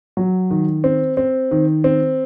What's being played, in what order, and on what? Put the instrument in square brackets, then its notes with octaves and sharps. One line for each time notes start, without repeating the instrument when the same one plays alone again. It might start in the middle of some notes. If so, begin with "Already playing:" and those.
[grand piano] F#3
D#3
C4
C4
D#3
C4